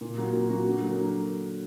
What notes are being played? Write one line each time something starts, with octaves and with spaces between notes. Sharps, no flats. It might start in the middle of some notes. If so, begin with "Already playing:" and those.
A#2
F#3 A#3 F#4
A#2
F#3 A#3 F#4
D3
F#3 A#3
D3